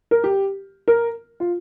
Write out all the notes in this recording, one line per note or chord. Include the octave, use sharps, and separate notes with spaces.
A#4
G4
A#4
F4